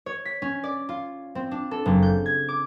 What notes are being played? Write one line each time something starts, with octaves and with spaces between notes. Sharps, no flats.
C#5
B6
C#4
D5
F4
C4
D4
A4
F#1
G6
G#6
D6